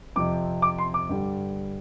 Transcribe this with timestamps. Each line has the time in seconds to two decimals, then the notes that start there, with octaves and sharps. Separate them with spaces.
0.16 F2 C3 F3 C4 D6
0.62 D6
0.78 C6
0.94 D6
1.09 G2 D3 G3